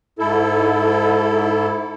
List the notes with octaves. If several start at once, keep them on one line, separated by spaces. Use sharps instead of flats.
G#2 E4 A4